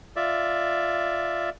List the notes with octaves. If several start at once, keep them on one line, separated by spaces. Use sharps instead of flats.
F4 D5 E5